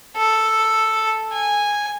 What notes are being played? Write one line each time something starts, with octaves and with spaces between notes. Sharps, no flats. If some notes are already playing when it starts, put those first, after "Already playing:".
A4
G#5